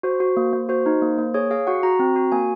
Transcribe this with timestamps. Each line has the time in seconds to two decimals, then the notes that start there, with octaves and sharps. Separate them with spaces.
0.03 F#4 C5
0.20 F#4
0.37 A#3
0.53 A#3
0.69 F#4 C5
0.86 D#4
1.02 A#3
1.18 A#3
1.34 G#4 C#5
1.51 G#4 F5
1.67 F#4 F#5
1.83 F#4 A#5
1.99 C4
2.16 F#4
2.32 A#3 G#5